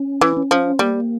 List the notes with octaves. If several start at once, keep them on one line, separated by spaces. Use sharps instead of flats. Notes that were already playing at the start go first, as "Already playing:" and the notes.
Already playing: C#4
E3
C#4
F3
G3 A#3